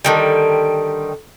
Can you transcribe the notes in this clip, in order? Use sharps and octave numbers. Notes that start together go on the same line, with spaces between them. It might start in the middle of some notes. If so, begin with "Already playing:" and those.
D3 D#3 G3